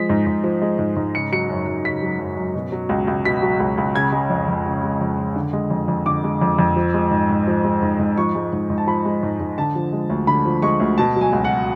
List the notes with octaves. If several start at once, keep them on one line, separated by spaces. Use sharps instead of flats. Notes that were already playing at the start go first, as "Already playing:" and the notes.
Already playing: F3 G#3 B6
G#2
G#2
F3
G#3
G#2
G#2
C#3 C#7
F#3 C#7
F#2
F#2
C#3 B6
F#3
F#2
F#2
B2
F#3
C#2
C#2
B2 B6
F#3
C#2
C#2
C#3 G#6
G#3
F2
F2
C#3
G#3
F2
F2
D3
G#3
F2
F2
D3 D6
G#3
F2
F2
F3
G#3
G#2
G#2
F3
G#3
G#2
G#2
F3 C#6
G#3
G#2
G#2
A5
F3 B5
G#3
G#2
G#2
D3 A5
F3
G#3
D2
D3 B5
F3
G#3 C#6
D2
B2 A5
F#3
G#5
C#2
F#5